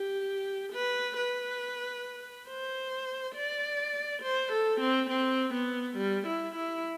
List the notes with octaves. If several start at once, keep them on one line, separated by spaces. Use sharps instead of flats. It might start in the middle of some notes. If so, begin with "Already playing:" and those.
Already playing: G4
B4
B4
C5
D5
C5
A4
C4
C4
B3
G3
E4
E4